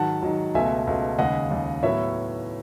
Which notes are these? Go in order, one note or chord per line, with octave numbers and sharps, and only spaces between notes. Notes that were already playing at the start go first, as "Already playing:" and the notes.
Already playing: G#2 D#3 F#3 F#5 A5
G#2 D#3 F#3
C#2 B2 A3 E5 G#5
C#2 B2 A3
D#2 C#3 G#3 D#5 F#5
D#2 C#3 G#3
A2 F#3 B3 E4 C#5 E5